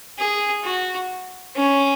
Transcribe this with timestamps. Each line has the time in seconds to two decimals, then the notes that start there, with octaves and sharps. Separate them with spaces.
0.18 G#4
0.64 F#4
1.56 C#4